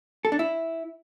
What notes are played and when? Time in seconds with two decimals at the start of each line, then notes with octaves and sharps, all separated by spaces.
0.25 A4
0.32 D4
0.39 E4